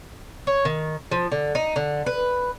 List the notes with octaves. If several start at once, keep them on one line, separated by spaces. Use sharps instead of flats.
C#5
D#3
F3
D3
D#4
D3
B4